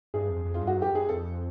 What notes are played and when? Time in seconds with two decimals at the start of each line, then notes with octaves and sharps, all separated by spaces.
0.14 G2 G#4
0.29 F2
0.45 F2
0.54 F4
0.61 G2
0.67 F#4
0.77 F#2
0.82 G4
0.93 F#2 G#4
1.09 F2 A4